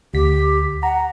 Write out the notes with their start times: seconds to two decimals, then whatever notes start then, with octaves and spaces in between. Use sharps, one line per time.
0.14 D2 G4 B6
0.83 F#5 A#5